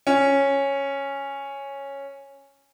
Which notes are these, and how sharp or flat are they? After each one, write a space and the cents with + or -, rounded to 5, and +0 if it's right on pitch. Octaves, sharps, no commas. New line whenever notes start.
C#4 -5